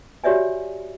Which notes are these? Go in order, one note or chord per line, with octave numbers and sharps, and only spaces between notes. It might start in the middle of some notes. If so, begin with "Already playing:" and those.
F#4 G4 C#5 D5 E5 G#5